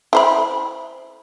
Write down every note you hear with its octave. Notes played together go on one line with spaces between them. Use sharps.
E4 C5 B5